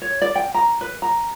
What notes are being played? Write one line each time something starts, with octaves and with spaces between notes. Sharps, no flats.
C#5
D5
G5
A#5
B4
A#5